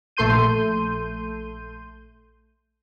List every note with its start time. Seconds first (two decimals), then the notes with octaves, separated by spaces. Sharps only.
0.17 A#1 A3 A4 C6 G6 D#7